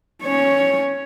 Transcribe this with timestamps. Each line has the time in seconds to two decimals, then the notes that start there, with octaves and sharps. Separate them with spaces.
0.23 C#4 C#5